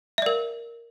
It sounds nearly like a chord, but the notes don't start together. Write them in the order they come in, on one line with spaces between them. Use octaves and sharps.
E5 D5 A#4